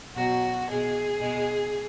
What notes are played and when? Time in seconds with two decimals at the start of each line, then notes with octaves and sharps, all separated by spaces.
0.16 B2 F#3 F#4
0.68 B2 G#3 G#4
1.20 B2 G#3